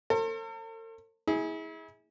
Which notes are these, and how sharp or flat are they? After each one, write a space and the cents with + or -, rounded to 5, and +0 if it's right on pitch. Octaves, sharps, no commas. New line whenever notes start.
A4 +45 C5 +45
E4 -35 G#4 +0